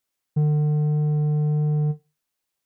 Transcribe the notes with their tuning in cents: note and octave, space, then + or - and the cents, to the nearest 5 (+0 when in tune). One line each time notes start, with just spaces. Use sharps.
D3 +40